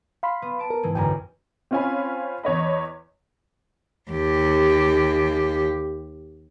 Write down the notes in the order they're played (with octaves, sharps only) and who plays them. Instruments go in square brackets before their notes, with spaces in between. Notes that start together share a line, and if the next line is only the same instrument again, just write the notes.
[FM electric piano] F5 B5 C6 [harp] C7
[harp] B3
A5 D7
[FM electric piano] A#4
[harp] G#2 E3 G#3
[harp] B1 F#2 D3 [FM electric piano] G5 G#5 A#5
[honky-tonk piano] C4 C#4 F4 C#5 G#5 B5
E2 C#5 D#5 B5
[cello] D#2 G4